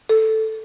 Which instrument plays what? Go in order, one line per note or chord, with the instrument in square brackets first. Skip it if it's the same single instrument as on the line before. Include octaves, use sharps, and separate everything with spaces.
[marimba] A4